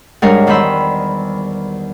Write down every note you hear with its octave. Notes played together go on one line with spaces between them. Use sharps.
G#2 G3 D4 A#4 C#5
E2 D#3 G3 C5 B5 E6